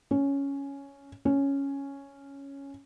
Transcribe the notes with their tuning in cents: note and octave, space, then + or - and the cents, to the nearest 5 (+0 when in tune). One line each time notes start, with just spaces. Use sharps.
C#4 +5
C#4 +0